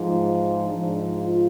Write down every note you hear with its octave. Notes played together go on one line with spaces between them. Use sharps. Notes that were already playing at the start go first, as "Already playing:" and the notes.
Already playing: G#2 F3
G#2 F3 D4
F4